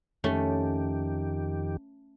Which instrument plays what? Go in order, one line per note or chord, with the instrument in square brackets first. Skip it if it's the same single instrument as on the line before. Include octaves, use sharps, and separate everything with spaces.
[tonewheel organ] F2 D#3 G4 [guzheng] A3 C#4